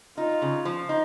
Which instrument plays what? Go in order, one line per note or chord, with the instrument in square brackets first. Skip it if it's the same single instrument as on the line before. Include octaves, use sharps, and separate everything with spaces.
[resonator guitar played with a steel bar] D#4 [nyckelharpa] F4
[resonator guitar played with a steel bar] C#3
F3
D#4